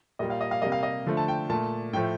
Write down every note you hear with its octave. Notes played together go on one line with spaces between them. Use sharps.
A#2 G3 A#3 D#5
F5
D#5
F5
C3 G3 A#3 D#5
F5
D#5
D3 F3 A3
A5
G5
A#2 A3 A5
A2 F3 A3 G5